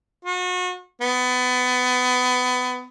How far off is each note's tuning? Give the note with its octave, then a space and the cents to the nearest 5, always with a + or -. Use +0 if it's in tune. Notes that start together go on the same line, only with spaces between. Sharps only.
F#4 -35
B3 +25